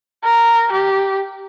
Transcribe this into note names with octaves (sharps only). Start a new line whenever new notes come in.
A#4
G4